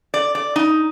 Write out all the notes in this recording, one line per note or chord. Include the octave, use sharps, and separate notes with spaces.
D5
D5
D#4